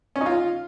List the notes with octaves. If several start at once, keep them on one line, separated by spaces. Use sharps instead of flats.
C#4
D#4
F4